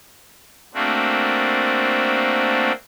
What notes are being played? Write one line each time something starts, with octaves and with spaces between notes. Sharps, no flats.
A3 A#3 C4 D4 F#4